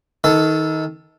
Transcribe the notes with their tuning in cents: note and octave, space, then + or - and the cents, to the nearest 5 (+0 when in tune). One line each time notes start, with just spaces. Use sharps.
D#3 +25 A4 +0